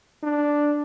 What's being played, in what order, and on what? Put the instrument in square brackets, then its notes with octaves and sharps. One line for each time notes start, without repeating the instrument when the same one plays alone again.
[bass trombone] D4